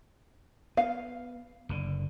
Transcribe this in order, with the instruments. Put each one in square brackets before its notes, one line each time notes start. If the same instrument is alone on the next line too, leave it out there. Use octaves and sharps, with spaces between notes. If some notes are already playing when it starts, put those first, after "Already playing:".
[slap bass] B3 [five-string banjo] F5
[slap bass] F#1 D3